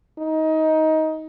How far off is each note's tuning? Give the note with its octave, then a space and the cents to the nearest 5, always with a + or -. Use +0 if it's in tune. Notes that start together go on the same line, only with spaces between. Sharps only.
D#4 +20